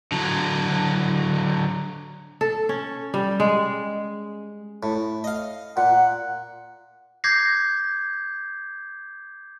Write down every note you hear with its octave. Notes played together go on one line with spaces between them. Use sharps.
D3 F#3
A4
C#4
G3
G#3
A2
D#5 F5
A#2 F#5
D6 G6 G#6 A#6 C7